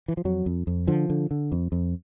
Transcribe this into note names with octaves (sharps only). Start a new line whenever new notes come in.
E3
F3
F2 F#3
F2
F2
D3 F3
D3
D3
F2
F2